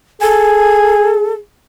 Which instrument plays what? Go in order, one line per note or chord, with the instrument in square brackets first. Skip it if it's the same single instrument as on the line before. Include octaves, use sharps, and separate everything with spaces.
[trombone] G#4 [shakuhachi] A4 [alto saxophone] G#5